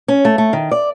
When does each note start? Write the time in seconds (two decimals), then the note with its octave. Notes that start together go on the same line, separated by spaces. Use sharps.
0.08 C#4
0.25 A3
0.38 A3
0.53 D#3
0.72 D5